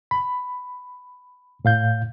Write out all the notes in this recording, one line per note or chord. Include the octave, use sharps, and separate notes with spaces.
B5
A2 F5 G6